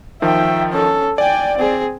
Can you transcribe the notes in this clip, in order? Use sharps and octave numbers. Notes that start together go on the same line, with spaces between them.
D#3 F3 E5 G5
C#4 A4
D5 G5 G#5
C4 G#4